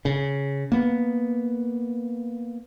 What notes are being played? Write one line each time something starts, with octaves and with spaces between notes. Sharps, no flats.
C#3
A#3 B3